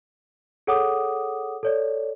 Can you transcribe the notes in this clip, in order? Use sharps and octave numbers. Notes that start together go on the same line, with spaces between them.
G#4 A4 C#5 F#5 D6 D#6
A4 C#5 D5